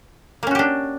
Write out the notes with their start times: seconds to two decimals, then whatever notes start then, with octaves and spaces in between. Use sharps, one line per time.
0.43 A#3
0.47 C#4
0.51 F#4
0.55 G4
0.59 D4